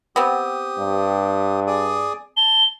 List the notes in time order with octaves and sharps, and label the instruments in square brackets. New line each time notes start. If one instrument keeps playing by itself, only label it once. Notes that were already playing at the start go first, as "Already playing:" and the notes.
[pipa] B3 C4 [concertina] G4 D#6
[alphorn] G2
[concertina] G#4 D5 D#6
[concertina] A5 [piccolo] G7